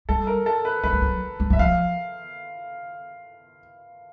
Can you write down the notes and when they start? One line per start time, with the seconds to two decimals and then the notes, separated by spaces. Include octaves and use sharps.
0.09 G3 A4
0.27 A#4
0.46 A4
0.65 B4
0.84 F#3 B4
0.93 G3
1.02 F#3
1.40 G3
1.50 F#3 E5
1.59 F3 F5